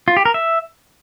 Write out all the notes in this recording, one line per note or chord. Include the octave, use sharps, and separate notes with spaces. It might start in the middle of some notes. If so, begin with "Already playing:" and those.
F4
G4
A#4
E5